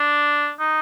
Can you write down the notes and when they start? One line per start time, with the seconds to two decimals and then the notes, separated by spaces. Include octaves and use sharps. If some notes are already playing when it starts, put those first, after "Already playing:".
Already playing: D4
0.59 D#4